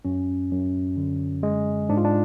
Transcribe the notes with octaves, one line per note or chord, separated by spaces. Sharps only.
F#2 C#4
F#2
D3
G#3
G#2 D4
F4
D4